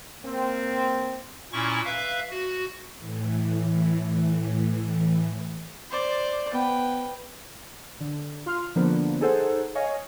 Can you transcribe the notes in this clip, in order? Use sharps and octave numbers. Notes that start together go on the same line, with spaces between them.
A#3 C4
A#2 C#4 E4 C#6
B4 E5 F5
F#4
A2 E3
C5 D5
B3 B4 G5
D3
F4 C6 F6
D3 F3 A#3 B3 D4
D#4 G#4 A4 C5 F#5
C#5 D#5 F5 G#5